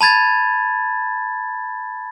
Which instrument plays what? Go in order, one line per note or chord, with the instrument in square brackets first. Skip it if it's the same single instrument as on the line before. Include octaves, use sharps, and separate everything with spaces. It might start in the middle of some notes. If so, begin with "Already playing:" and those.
[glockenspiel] A5 B5 G#6 A6